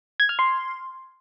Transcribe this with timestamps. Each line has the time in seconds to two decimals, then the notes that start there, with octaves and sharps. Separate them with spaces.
0.20 G#6
0.29 F6
0.39 C6